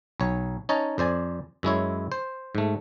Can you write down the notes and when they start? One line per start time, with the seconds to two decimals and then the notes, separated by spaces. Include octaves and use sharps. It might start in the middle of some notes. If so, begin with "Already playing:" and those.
0.20 B1 C#5
0.69 C#4 D#4 C#5 D#5 A5
0.98 F2 C5 D5 G#5
1.63 F#2 G#3 E4 C#5
2.12 C5
2.55 G#2 A3